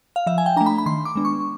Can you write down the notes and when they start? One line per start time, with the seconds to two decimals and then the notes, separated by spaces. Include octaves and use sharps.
0.16 F5
0.27 F3 E5
0.38 G#5
0.46 G5
0.56 A3 D4 A#5
0.66 B5
0.78 B5
0.86 D#3 C6
1.05 D6
1.16 G#3 B3 D4
1.25 C#6